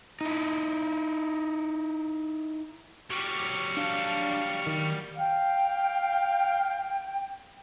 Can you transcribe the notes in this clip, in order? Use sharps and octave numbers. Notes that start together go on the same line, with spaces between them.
D#4 E4
F#3 G3 C#6 D6 F6 D7
D4 F5
D#3
F5 G5